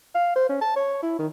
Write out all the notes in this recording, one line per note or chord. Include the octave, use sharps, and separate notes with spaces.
F5
C5
C#4
A5
C#5
E4
D#3